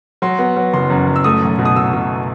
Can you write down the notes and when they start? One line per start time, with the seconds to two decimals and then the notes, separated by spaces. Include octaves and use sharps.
0.22 F#3 C6
0.39 B3
0.57 F#3
0.73 F#1 C6
0.90 F#2
1.07 F#2
1.16 E6
1.24 A3 D#6
1.42 B1
1.59 B2
1.65 D#6
1.76 B2 E6
1.93 B2